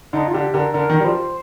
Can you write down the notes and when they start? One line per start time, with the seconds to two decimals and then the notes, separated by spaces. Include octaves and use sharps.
0.13 D3 D#4
0.28 F4
0.34 D3 G4
0.54 D3 A#4
0.74 D3 A#4
0.90 D#3
1.00 G3
1.04 F3 C5